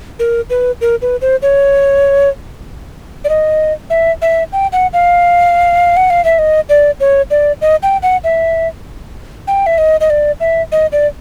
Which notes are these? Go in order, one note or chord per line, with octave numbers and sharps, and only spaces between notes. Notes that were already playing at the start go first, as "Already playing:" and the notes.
A#4
B4
A#4
B4
C5
C#5
D5
D#5
E5
E5
G5
F#5
F5
F#5
F5
E5
D#5
D5
C#5
D5
D#5
G5
F#5
E5
G5
E5
D#5
D#5
D5
E5
D#5
D5